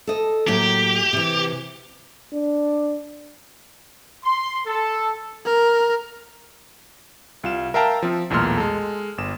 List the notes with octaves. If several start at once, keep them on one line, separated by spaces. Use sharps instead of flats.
A4 D#5
A2 F#3 A#3 G4
C3 E3
D4
C6
A4
A#4
C2 F4 E7
A#4 E5 F5 G5 A5 A#5
F3 C4
B1 E2 A#2 A3 C6 F6
G#3 A4
G1 E7